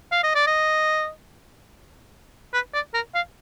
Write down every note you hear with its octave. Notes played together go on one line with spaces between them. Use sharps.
F5
D#5
D5
D#5
B4
D5
A#4
F5